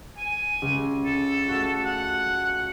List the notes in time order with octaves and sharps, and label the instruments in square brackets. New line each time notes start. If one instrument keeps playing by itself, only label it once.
[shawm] G#5
[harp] C#2
[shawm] A4
[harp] A3 F#4
[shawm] F#5